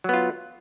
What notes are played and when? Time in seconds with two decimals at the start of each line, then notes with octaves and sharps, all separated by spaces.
0.04 F#3
0.09 B3
0.14 F4